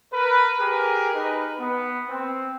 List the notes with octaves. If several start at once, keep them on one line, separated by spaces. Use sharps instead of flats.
A#4 B4
G4 G#4 A#4
D#4 B4
B3
C4